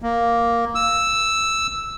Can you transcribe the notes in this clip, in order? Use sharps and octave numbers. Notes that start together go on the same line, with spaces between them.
A#3
E6